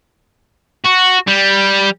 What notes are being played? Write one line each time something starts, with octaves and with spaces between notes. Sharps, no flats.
F#4
G3